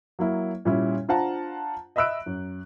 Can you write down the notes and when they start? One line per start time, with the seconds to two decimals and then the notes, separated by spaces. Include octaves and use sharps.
0.19 F#3 A#3 E4
0.65 A#2 G3 C#4 E4
1.08 D4 F4 C5 F#5 A5 A#5
1.96 D#5 E5 B5 E6 F#6 D7
2.26 F#2